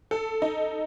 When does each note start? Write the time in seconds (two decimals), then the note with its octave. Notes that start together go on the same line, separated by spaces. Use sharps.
0.11 A4
0.42 D#4